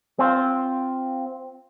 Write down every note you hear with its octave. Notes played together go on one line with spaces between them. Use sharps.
C4 F4